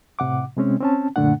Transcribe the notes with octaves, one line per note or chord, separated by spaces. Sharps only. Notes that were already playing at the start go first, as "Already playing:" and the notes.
A2 C3 F#5 D6
C3 G#3 C4 C#4
C4 C#4 A5
F#2 A#2 D3 A3 D4 F#5